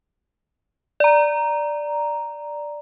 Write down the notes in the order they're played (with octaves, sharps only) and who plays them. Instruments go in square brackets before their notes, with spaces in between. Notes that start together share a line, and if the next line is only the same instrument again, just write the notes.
[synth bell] D5 A#5